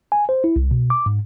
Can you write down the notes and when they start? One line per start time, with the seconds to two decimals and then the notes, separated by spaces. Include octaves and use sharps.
0.12 G#5
0.29 C5
0.44 E4
0.56 C2
0.71 B2
0.90 D6
1.06 G#2